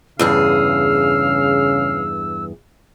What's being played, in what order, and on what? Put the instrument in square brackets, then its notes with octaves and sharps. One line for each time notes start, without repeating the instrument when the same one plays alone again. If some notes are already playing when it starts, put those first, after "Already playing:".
[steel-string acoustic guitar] E2 G2 G#4 [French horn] C#3 [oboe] F5 [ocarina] E6